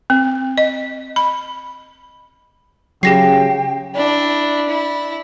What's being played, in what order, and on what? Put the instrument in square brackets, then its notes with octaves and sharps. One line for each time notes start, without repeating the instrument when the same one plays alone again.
[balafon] C4
D#5
B5
[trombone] C#3 [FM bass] F#3 [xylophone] G4 A#6 C7 [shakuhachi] G5
[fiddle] D4 E4
E4